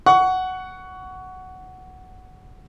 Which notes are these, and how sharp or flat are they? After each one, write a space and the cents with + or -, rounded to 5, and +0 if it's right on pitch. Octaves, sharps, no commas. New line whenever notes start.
F#5 +5 C#6 +20